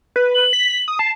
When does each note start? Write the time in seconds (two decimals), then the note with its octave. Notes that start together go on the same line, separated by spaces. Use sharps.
0.16 B4
0.35 F#7
0.53 B6
0.88 D#6
0.99 A5 C7